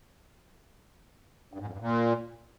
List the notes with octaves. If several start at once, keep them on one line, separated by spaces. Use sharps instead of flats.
G2
G#2
F2
G2
A#2